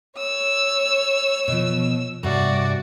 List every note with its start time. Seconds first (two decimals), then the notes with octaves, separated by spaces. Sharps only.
0.18 C#5 E6
1.48 B2 F3
2.23 G2 C3 F#4 D5